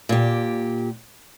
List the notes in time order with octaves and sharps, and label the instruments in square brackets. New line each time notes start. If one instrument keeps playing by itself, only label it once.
[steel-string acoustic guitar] A#2 G4